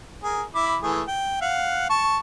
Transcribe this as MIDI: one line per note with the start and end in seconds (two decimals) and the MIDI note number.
0.23 0.43 68
0.23 0.43 70
0.55 0.76 64
0.55 0.76 83
0.55 0.76 86
0.82 1.03 52
0.82 1.03 57
0.82 1.03 68
1.08 1.41 79
1.42 1.86 77
1.42 1.86 78
1.90 2.18 81
1.90 2.18 85